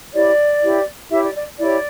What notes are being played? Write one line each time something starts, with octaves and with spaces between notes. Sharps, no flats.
E4 G4 C#5 D5
E4 G4 C#5
E4 G4 C#5 E5
D5
D5
E4 G4 C#5 D5